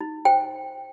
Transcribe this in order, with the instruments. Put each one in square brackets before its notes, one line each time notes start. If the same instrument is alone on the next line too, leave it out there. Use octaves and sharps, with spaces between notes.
[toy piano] D#4
C5 G5